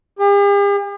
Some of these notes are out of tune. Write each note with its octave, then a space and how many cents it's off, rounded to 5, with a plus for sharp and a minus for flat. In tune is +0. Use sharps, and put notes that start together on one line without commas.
G4 +45